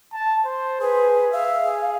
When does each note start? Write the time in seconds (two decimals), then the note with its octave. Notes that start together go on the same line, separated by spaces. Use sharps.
0.13 A5
0.45 C5
0.81 G#4 B4
1.32 E5 F5
1.64 G#4